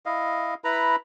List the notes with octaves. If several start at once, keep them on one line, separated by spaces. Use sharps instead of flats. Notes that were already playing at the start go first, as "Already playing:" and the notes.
E4 D#5 F5
E4 B4 A#5 B5